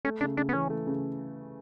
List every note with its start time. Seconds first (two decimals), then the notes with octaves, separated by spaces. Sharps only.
0.05 A3 C#4
0.21 C#3 D4
0.37 C#3 D4
0.49 B3
0.53 E3 C#4
0.70 A3
0.87 C#3